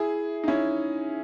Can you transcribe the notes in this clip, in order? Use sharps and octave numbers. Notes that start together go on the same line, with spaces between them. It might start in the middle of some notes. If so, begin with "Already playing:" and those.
Already playing: E4 G#4
D#4
C#4 E4